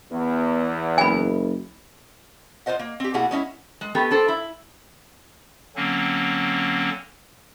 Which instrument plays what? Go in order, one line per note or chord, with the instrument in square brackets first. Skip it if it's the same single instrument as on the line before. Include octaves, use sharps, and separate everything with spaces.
[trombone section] E2 [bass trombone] B3
[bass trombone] F#1 [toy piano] G#5 B5
[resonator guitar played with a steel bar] F4 F#4 C5 D#5 F#5
A#3
C4 G4
B2 A#3 E4 F#4 G#4 F#5
G#3 C#4 D#4 E4
G#3
A3 B3 G4
D4 A4 C5
E4
[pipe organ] D3 F#3 A#3 C4 C#4